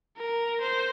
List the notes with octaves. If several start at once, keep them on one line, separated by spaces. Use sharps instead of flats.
A#4
C5